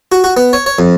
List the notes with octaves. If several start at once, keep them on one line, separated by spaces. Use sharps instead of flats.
F#4
F#4
B3
C#5
C#5
F2